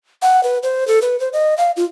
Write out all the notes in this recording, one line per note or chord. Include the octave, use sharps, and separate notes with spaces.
F#5
B4
C5
A4
B4
C5
D#5
F5
F4